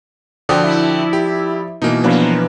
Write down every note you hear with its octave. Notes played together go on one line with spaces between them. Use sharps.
D3 F3 F#4 D5 G5 D#6
E4
G4
B2 E3 A#3 D#4
F3 F#3 A#3 B3 D4